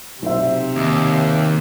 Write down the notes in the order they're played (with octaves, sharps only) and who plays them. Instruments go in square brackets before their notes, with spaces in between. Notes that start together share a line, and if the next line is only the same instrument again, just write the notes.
[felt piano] B1 C5 E5 [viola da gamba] C3
[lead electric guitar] D#2